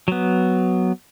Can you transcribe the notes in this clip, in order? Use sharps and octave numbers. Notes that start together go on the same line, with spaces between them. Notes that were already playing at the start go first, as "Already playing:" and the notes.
F#3 B3